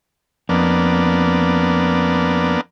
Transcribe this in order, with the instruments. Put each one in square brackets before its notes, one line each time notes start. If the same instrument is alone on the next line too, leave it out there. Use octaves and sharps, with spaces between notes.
[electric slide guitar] F2 [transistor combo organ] A#3 B3 D4